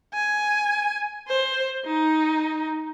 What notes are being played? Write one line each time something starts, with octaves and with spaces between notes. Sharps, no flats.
G#5
C5
D#4